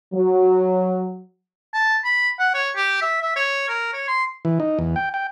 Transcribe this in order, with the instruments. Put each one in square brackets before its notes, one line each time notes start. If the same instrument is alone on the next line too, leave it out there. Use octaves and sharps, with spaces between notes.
[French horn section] F#3
[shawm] A5
B5
F#5
C#5
G4
E5
E5
C#5
A#4
C#5
C6
[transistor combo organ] E3
D#4
E2
G5
G5